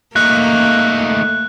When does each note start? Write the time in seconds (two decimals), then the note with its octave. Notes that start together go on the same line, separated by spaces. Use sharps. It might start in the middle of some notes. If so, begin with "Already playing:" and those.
0.16 A3 A#3 D#4 F#6